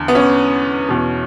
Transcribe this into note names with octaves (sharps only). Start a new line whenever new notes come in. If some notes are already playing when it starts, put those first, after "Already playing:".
Already playing: E2 D3
B3
C#4
E2 B2